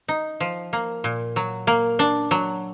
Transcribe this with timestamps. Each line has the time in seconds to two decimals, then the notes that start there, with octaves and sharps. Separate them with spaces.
0.08 D#4
0.40 F3
0.73 A#3
1.04 A#2
1.36 F#3
1.67 A#3
1.99 D4
2.31 F#3